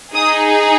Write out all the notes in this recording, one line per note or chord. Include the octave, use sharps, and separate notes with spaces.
D#4 G#4 D#6